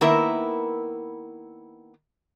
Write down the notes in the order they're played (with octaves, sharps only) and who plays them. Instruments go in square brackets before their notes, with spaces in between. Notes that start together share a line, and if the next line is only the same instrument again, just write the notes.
[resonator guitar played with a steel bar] D#3 A#3 B3 E4 A#4 E5